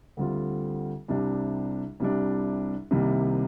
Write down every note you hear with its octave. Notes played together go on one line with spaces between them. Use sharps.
D2 D3 G3 C4 F4
C2 C3 G3 D4
C2 C3 G3 D4
C2 C3 D#3 G3 A#3